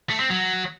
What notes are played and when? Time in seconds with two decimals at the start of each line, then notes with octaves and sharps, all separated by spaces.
0.10 A3
0.20 C4
0.30 F#3